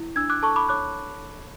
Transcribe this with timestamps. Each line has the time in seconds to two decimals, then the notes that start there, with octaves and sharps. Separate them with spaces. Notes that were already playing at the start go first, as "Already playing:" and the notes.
Already playing: E4
0.16 D4 E6 G#6
0.30 D6 F#6
0.42 A4 A5 C#6
0.56 B5 D6
0.69 C#5 D6 F#6